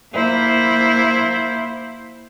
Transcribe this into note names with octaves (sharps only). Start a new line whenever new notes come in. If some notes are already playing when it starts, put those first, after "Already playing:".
A#3 E4 C5